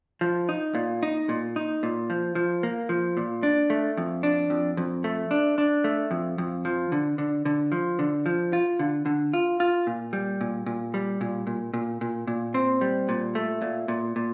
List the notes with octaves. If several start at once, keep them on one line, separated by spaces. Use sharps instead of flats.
F3
D#4
A#2
D#4
A#2
D#4
A#2
F3
F3
A#3
F3
A#2
D4
A3
F2
D4
F2
F2
A3
D4
D4
A3
F2
F2
F3
D3
D3
D3
F3
D3
F3
F4
D3
D3
F4
F4
A#2
G3
A#2
A#2
G3
A#2
A#2
A#2
A#2
A#2
C4
G3
A#2
A3
A#2
A#2
A#2